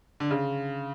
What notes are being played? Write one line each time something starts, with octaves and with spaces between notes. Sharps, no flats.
D3
C#3